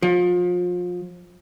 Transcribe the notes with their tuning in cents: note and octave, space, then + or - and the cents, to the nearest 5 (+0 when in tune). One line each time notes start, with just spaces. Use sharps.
F3 +30